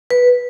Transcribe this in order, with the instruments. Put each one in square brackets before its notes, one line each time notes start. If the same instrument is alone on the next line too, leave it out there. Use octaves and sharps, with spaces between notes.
[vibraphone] B4